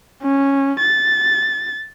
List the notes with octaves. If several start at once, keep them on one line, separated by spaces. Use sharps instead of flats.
C#4
A6